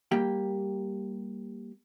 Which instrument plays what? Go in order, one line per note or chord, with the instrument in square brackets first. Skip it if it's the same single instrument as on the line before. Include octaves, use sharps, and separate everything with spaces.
[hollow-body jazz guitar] G3 A#3 G4 G5